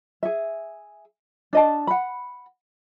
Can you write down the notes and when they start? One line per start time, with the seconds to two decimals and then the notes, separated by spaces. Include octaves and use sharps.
0.23 G#4 E5
1.53 D4 D#5 A5
1.87 F#5 B5